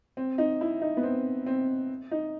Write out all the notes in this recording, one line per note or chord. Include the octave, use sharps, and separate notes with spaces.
C4
D#4
E4
D#4
B3
C4
C4
D#4